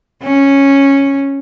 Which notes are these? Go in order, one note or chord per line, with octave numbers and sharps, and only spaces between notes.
C#4